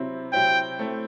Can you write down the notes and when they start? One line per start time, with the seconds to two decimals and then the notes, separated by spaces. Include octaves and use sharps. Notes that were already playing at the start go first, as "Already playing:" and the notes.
Already playing: C3 F#3 C4 E4
0.33 C3 F#3 C4 E4 G5
0.79 A3 C4 E4